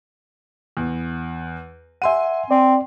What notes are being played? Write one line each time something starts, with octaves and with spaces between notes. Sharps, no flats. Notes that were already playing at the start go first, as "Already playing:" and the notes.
E2
E5 F#5 G#5 C6 D#7
C4 D5